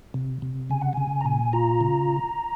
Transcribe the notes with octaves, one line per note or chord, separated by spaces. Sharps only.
C3
C3
C#3 G#5
F#5
C#3 G#5
A#5
A#2 G#5
F4 A#5
C#3